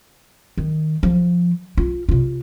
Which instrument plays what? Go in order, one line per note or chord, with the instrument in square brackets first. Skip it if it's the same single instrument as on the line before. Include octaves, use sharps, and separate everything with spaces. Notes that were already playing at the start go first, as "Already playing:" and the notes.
[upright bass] D#3
F3
F4
C3 F4